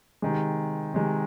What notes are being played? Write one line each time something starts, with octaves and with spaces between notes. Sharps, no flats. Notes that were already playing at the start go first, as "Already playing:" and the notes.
C3 D#3 G#3
C3 D#3 G#3